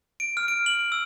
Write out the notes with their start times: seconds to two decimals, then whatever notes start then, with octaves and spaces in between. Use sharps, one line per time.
0.20 D7
0.37 F6
0.48 D7
0.66 F#7
0.92 E6